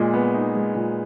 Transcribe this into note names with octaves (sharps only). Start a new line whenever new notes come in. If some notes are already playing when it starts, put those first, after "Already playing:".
Already playing: A#2 G#3
B3
D#4
G#3
A#2